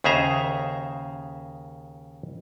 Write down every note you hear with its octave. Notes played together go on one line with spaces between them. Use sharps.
D#2 C#3 G#4 C5 E5 A#5